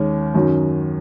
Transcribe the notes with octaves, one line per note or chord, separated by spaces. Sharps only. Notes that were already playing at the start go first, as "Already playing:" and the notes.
Already playing: D#2 D#3 G#3 C#4
F#2 D#3 F#3